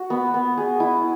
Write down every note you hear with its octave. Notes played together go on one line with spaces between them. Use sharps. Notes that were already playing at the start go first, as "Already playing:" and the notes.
Already playing: F#4
B3
B3
G#4
E4